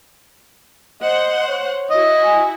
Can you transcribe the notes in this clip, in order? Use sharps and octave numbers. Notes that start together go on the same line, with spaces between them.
C5 D#5 F#5
C#5
E4 F#4 D#5
G#5